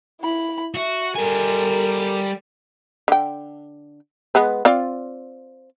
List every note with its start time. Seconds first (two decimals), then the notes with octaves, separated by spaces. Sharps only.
0.21 E4 B5
0.75 F#4 E5
1.15 G3 A4 A#4 G#5
3.08 D3 G5
4.35 G#3 B3 B4
4.65 C4 F4 D5